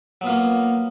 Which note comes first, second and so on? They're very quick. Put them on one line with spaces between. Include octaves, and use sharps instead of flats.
F#3 B3 F4 A#3